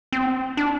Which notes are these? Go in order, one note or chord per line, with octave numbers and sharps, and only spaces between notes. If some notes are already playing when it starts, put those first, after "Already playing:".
C4
D4